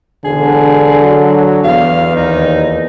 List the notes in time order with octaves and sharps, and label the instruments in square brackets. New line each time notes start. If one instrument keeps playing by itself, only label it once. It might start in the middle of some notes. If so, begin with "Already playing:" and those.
[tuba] E1 [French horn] D3 [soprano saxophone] G#4
[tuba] F#3
[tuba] E2 [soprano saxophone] F5
[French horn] D#2 [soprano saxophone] D#4